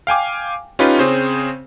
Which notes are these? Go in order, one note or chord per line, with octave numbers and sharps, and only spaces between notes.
F5 G5 G#5 D6
C#4 D#4 F4 G4 B4
C#3 C4 G#4 C5 C#5